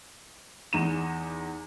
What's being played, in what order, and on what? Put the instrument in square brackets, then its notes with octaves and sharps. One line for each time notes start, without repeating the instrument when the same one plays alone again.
[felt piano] E2 D#4 E7